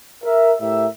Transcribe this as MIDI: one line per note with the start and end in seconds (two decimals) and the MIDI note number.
0.24 0.53 70
0.24 0.53 76
0.61 0.88 45
0.61 0.88 67
0.61 0.88 70
0.61 0.88 76